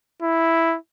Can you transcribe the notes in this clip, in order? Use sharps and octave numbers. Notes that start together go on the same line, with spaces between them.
E4